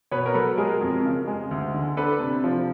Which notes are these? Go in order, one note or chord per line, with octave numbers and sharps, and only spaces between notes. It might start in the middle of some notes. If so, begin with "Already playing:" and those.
B2 B4 C#5
A#4
F#3 A4 B4
G#3 G#4 A#4
F2
C#3
G#3
D2
D3
D4 A4 B4
C3
F3